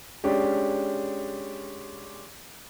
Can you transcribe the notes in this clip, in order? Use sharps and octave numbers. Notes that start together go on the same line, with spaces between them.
G#3 C#4 D4 G4